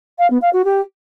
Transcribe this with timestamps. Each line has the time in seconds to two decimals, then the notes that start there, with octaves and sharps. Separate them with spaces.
0.18 F5
0.30 B3
0.41 F5
0.53 F#4
0.64 G4